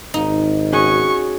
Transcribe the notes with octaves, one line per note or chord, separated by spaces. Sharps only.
G#1 D#4
C#4 F#4 G#4 C#6